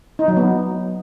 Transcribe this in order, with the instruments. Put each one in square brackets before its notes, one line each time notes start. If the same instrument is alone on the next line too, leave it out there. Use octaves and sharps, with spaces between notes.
[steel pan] D#4
F#3
B3